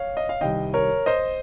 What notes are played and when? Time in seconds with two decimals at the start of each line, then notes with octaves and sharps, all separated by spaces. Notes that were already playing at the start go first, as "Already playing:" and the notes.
Already playing: C#5 F5
0.17 D#5
0.29 F5
0.41 C2 C3 D#3 D#5 G5
0.74 A#4 C#5
1.06 C5 D#5